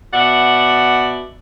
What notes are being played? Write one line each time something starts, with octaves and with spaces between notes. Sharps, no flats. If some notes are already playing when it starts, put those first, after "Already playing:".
B2 D5 E5 F#5